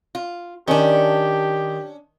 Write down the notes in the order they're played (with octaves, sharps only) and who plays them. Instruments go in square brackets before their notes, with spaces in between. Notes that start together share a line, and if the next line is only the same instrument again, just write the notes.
[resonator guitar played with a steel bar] F4
[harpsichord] D#3 [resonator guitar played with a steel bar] C#4 D4 [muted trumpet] G4